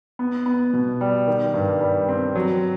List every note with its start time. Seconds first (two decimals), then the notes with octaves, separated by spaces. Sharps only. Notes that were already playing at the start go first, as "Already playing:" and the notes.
0.19 B3
0.46 B3
0.73 B2
1.01 G3
1.28 D#3
1.54 G2
1.81 G3
2.09 C4
2.35 F#3